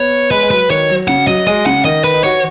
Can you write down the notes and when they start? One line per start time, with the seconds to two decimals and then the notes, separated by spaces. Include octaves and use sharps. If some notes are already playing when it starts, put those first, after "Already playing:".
Already playing: B3 C#5
0.31 G#3 B4
0.43 G#3
0.51 F#3 B4
0.70 D#3 C#5
0.90 F#3
1.08 C#3 F#5
1.27 F#3 D#5
1.47 G#3 D#5
1.66 C#3 F#5
1.85 D#3 D#5
2.04 B4
2.14 D#4
2.24 F#4 C#5